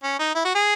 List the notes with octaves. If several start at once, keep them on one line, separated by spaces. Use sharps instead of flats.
C#4
D#4
E4
F#4
G#4